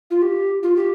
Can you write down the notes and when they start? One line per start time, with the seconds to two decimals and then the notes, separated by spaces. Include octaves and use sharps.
0.11 F4
0.22 G4
0.63 F4
0.76 G4